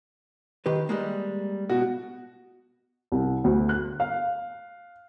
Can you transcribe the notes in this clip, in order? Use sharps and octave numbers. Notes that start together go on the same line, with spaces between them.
D#3 G4 B4
G3 G#3 A#3
B2 F#4
C2
D2
F#6
F5